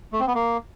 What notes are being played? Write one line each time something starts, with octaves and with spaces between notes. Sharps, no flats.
A3
C4
B3
A#3